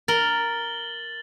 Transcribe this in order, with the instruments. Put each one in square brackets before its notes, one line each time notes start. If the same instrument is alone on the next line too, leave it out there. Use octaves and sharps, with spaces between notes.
[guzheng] A#4 [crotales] A6 F#7 G7